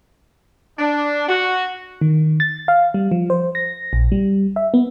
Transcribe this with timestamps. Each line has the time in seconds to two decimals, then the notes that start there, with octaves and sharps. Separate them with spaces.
0.78 D4
1.28 F#4
2.01 D#3
2.40 A6
2.68 F5
2.94 G3
3.12 F3
3.30 C5
3.55 A#6
3.93 A#1
4.12 G3
4.56 E5
4.74 B3